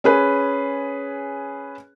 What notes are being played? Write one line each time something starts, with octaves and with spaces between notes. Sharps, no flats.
C#4 G#4 B4